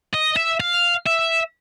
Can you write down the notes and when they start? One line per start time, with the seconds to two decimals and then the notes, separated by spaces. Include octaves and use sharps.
0.13 D#5
0.36 E5
0.60 F5
1.07 E5